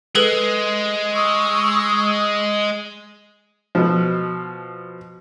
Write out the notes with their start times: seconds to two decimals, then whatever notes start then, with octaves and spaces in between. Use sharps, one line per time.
0.15 G#3 G#4 A4 B4
1.14 C#6 D#6 E6
3.75 B2 F3